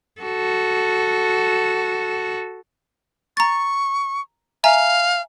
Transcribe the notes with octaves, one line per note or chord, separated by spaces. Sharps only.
F#4 A4
A#5 C#6 A6
E5 F5 G#5 A#5